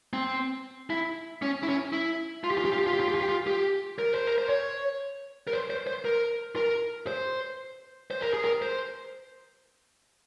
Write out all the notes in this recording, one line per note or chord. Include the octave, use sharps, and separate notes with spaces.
C4
E4
C#4
E4
C#4
E4
F4
G4
F4
G4
F4
G4
F4
G4
F4
G4
F4
G4
F4
G4
A#4
C5
A#4
C5
C#5
A#4
C5
C5
C5
A#4
A#4
C5
C5
A#4
G#4
A#4
C5